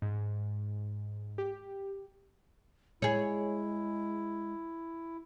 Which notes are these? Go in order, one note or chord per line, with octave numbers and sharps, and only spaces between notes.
G#2
G4
G#3 E4 G#4 C#5